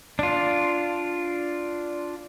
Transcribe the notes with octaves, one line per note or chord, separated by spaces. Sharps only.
D4 F4